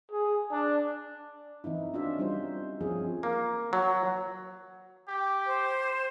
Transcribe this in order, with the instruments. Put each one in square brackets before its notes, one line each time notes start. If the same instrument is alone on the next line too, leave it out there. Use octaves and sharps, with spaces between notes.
[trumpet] G#4
D4
[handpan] E3 C4 D#4 E4
C#4 D4 F4 F#4 D5 E5
G3 C4 D#4 C5
F3 C4 C#4 F4 G#4
[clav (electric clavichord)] A#3
F#3
[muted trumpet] G4
[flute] C5